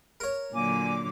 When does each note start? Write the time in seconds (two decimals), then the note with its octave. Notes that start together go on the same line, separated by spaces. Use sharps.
0.20 A#4 C#5
0.54 A#2 D3 F#3 A#3 G#5 D6